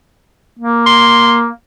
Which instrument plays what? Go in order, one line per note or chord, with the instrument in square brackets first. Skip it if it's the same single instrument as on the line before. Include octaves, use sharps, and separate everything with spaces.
[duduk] A#3
[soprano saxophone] C6